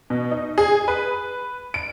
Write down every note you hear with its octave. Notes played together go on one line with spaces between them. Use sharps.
B2
D#4
G#4
B4
D7